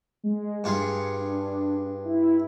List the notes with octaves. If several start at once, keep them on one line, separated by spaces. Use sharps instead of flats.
G#3
G2 F4 G#4 C#7
D4
E4